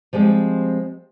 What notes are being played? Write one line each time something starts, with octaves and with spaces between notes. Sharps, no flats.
F3 G3 G#3 C4